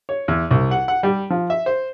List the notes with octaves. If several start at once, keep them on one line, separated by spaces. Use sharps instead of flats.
C#5
E2
C2
F#5
F#5
G3
F3
E5
C5